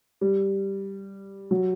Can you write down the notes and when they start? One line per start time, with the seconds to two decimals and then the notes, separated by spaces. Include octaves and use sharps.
0.21 G3
1.51 F#3